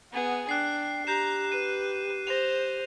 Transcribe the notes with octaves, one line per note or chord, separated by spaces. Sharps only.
B3 G#4 F#5
D4 G5 F#6 C7
G4 A#5 G6 C7 E7
B4 D#7
C5 A#6 F7